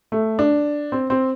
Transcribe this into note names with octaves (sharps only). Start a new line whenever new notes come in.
A3
D4
C4
C4